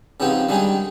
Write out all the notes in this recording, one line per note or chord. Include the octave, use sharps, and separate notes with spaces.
C#3 F3 B3 C4 D#4 G4
D#3 G3 G#3 D4 D#4 G#4